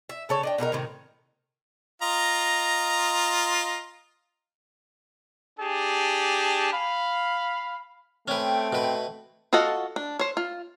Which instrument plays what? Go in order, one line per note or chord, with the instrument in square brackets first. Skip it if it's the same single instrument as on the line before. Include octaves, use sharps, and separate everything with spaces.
[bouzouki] E5
C#3 A4 C#5
D4 D#5 G5
B2 D4 D#4 A#4
A2 C3 D#3
[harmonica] F4 D#5 A#5
[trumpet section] D4 G4 G#4 A5
F5 B5
[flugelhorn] A3 [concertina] C4 [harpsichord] C#4 B4 [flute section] G5
[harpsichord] B2 B4
[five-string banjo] F4 F#4 A4 D#5 F#5
D4
C5 C#5
F4